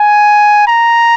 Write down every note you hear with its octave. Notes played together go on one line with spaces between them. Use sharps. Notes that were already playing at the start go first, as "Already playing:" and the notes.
Already playing: G#5
A#5